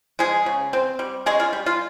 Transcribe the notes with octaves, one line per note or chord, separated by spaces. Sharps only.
F3 G#3 G#4
C#3
C4
G3
G#3 C#4 G#4
F4
G3
F4